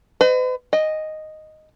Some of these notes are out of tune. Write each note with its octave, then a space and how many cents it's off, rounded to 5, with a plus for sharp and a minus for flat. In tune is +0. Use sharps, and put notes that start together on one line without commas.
B4 +45 D#5 -20
D#5 +0 G5 +45